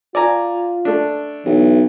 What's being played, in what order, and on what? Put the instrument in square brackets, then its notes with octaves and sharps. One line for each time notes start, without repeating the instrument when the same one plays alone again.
[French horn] F4 [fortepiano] D5 G#5 A#5
[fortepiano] A3 D4
[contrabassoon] B1 [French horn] E3